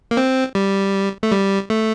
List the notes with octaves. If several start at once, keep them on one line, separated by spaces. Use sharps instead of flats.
A#3
C4
G3
A3
G3
A3